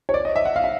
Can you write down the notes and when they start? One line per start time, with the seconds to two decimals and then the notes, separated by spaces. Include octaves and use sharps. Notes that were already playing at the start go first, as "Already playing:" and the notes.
0.09 C#5
0.14 D5
0.25 D#5
0.36 E5
0.45 F#5
0.56 F5
0.64 E5